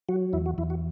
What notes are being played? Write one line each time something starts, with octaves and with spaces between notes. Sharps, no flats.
F#3 F#4
E2 E4
F#4
E2 E4
F#4